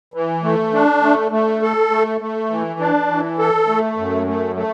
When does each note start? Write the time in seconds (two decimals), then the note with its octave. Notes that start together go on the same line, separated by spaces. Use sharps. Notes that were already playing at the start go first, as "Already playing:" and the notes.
0.14 E3
0.43 A3
0.73 D4
1.02 A3
1.31 A3
1.62 A4
1.90 A3
2.21 A3
2.50 E3
2.80 D4
3.09 E3
3.38 A4
3.67 A3
3.97 F#2
4.27 A3
4.56 A3